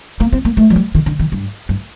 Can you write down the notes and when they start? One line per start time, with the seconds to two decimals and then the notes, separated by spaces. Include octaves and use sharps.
0.20 A#3
0.33 C4
0.45 A#3
0.57 A3
0.70 F3
0.76 G3
0.95 D#3
1.06 D3
1.20 D#3
1.32 G2
1.69 G2